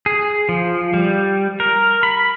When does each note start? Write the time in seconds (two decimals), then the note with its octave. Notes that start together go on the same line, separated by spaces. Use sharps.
0.06 G#4
0.49 F3
0.94 G3
1.60 A#4
2.03 B5